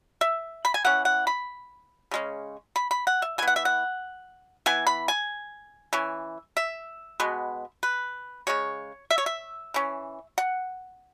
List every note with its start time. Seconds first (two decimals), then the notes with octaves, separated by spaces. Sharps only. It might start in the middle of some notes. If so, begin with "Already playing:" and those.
0.21 E5
0.65 B5
0.74 G#5
0.85 E3 C#4 F#5
1.05 F#5
1.27 B5
2.11 C#3 G#3 C#4
2.76 B5
2.91 B5
3.07 F#5
3.22 E5
3.38 E3 G#5
3.42 B3
3.48 F#5
3.56 E5
3.65 F#5
4.66 E3 B3 G#5
4.87 B5
5.08 G#5
5.93 E3 C#4
6.57 E5
7.20 B2 G#3 B3
7.83 B4
8.47 C#3 G#3 C#5
9.11 E5
9.18 C#5
9.26 E5
9.74 E3 C#4
10.38 F#5